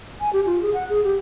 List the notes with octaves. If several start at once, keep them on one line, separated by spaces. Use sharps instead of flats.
G#5
G4
F4
G#4
F#5
G#4
G4